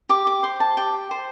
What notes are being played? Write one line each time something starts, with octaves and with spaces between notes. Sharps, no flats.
G4 D6
D6
C5 C6
A5
G4 G5
C5